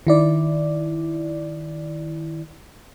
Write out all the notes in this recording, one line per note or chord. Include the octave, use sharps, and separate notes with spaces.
D#3 E4 D5